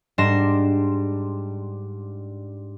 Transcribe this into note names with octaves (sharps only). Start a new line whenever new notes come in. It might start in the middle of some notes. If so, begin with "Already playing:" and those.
G#2 G3 D4 C6 A#6 E7